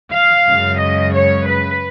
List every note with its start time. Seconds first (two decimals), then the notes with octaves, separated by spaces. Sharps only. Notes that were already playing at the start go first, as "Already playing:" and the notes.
0.13 F5
0.47 F#2 C#3 G#3
0.81 D#5
1.14 C#5
1.47 B4